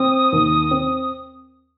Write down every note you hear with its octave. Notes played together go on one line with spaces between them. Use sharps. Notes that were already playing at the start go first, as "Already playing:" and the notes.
Already playing: C4 D#6
D#2
C4